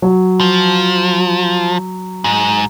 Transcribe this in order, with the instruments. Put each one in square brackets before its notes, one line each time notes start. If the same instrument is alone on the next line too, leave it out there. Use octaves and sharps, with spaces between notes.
[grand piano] F#3
[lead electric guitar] F3
G#2